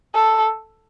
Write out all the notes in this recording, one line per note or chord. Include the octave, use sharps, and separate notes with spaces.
A4